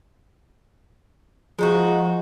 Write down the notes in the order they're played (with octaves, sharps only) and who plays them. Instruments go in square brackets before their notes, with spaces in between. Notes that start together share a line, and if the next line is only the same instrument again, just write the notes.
[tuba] F3 [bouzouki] G#3 D#4 F#4